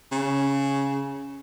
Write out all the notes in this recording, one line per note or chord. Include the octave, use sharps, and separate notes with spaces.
C#3